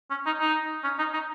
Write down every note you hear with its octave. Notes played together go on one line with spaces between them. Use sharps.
C#4
D#4
D#4
C#4
D#4
D#4